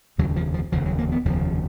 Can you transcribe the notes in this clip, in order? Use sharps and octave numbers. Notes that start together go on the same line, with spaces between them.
F1 D#2 C#3 F#3
F3
F3
F1 D#2 C#3 F3
F#3
A#3
B3
F1 D#2 C#3 F3